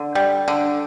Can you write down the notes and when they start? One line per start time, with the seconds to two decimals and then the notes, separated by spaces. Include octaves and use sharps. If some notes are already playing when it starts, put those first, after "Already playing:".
Already playing: D3
0.15 G3
0.48 D3